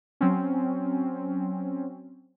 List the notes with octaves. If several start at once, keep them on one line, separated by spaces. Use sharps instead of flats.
F#3 C4 C#4